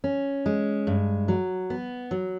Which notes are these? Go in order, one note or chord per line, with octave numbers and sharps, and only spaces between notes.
C#4
G#3
G2
F#3
B3
F#3